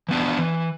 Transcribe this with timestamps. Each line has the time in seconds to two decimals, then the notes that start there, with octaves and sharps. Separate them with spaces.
0.09 E3 B3 D4
0.38 E3